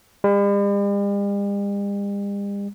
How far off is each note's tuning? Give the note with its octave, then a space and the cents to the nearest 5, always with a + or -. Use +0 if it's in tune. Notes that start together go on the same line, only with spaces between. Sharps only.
G3 +45